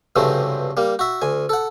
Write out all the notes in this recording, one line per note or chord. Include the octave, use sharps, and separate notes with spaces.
C#2 G2 C3 E3 F#3 A3
G3 A#3
F#4 E5
D2 G#5
A4 F#5